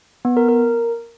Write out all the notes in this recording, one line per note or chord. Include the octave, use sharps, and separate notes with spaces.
B3
A#4
A#4